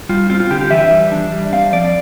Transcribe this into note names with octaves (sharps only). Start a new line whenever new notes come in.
G3 F4
C4 F4
F4
D3 G4
G4
E3 E5
G3
D4
G3
C4 F5
F3 D5